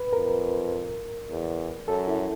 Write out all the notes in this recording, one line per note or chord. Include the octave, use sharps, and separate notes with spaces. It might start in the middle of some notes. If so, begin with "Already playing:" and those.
Already playing: B4
F2 A#4
E2
F#2 A4
E4